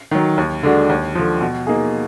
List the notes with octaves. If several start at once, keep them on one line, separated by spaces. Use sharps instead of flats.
D#3 F#3
D#2
D3 G#3 D4 F#4
D#2
D3 F3
B2
A#3 D#4 G#4